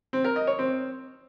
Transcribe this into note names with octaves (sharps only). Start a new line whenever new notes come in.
C4
A#4
D#5
C#5
C4